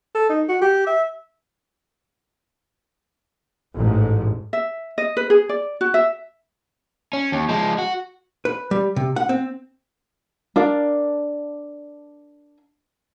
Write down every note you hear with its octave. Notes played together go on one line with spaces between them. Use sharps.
A4
D#4
F#4
G4
E5
A1 G#2
E5
D#5
B4
G#4
D5
F#4
E5
C#4
D#2
F3 G#3
F#4
B4
G3
C3
F#5
C4
D4 A#4 D5 F5